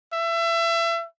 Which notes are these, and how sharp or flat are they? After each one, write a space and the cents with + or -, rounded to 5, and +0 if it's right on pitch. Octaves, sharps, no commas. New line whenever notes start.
E5 +30